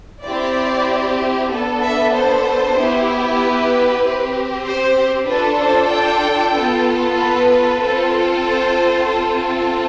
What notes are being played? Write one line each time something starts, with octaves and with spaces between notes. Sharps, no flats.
C4 E4 G4 D5
B3 D4 A4
E5
C5
B3 E4 G4
B4
C4 G4
C5
D4 F4 A4 B4
C5
G5
B3 F4 A4
B4
C4 F4 A4
C5
C4 F4 A4